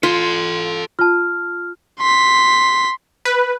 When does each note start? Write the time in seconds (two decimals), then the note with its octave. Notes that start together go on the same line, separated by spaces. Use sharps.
0.03 F4 A4 C6
0.99 F4 A5 F6
2.00 C6 B6
3.25 B4